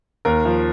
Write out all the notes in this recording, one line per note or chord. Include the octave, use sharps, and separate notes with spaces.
D#2 A#4
F3